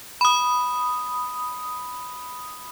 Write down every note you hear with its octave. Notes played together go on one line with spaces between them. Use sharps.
B5 D#6